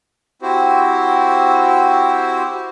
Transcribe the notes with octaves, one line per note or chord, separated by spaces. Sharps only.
C4 E4 F#4 G4 C5